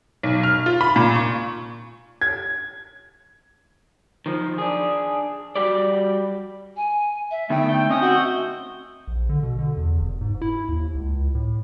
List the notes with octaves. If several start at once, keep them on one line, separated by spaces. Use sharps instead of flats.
B1
F6
F4
B5
A#2
C#6
G#6
D#3 F3
D4 G#4
G3 F#4 G4 D5
G#5
E5
D3 A3 B3 D#4 G5
A3 E5 G6
C4 C#4 D#5 D#6
F#4
A#1
D3
B2
D3
E2
F1
G#2
E4
D#2
C#2
A2